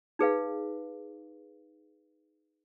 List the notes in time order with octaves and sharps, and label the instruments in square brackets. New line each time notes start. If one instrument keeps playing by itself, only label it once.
[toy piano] D#4 G#4 B4 F5